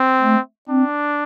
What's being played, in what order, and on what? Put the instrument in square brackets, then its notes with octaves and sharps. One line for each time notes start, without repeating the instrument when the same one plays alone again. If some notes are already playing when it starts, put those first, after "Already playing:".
Already playing: [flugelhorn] C4
[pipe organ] A3
[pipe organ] C4 [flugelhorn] D4